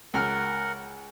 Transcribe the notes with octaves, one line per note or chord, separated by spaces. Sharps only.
C#2 A#4 F#5 F6